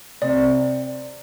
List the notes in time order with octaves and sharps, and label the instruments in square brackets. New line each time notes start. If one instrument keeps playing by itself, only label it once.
[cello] C3 [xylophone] D5